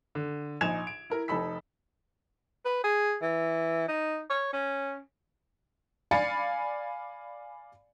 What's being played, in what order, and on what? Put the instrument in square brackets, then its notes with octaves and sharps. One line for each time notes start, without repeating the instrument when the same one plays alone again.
[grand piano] D3
A#1 D#4 G#5 G#6 E7 F7
D7
E4 A#4
F1 D#4 A4 B5 E6 B6
[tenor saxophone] B4
G#4
E3
D#4
C#5
C#4
[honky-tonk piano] D5 F5 G#5 B5 A6 C#7